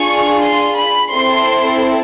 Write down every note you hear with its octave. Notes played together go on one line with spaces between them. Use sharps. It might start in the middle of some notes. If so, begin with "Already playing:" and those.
Already playing: D4 F4 G#4 C#6
C6
B5
C4 E4 A4 C6